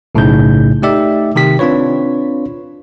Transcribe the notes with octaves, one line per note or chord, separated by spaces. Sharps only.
B1 A2 C#3 D#4 G#4 G6
A3 D#4 G4 D5 E5
C3 D#3 G4 B6
C4 D4 F4 B4 C#5